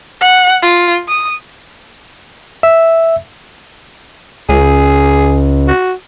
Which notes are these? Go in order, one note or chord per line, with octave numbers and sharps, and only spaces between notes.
F#5
F4
D#6
E5
C#2 G#4
F#4